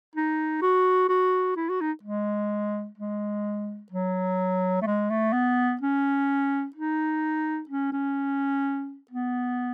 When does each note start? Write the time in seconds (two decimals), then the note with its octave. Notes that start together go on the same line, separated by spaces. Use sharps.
0.16 D#4
0.62 F#4
1.09 F#4
1.57 E4
1.69 F#4
1.81 D#4
2.03 G#3
2.98 G#3
3.92 F#3
4.81 A3
4.87 G#3
5.10 A3
5.33 B3
5.81 C#4
6.76 D#4
7.69 C#4
7.93 C#4
9.11 B3